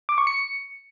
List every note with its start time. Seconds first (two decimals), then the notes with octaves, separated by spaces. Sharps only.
0.09 D6
0.18 C#6
0.27 C#7